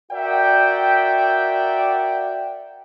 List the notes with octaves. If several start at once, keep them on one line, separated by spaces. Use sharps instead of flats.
F#4 A#4 D5 E5 F#5 G5